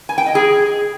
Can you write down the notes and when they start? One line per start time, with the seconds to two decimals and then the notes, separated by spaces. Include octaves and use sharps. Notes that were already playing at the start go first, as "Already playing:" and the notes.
0.09 G#5
0.18 G5
0.26 D#5
0.35 G#4